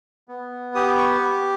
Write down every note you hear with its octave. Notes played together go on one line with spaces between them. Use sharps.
B3
G4 D#6
C#6